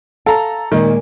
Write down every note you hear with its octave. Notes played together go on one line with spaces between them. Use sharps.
A4 F5 A#5
A#2 D#3 G#3 A#3